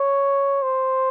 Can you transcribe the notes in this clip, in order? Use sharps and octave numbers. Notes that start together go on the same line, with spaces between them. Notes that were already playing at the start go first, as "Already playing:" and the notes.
Already playing: C#5
C5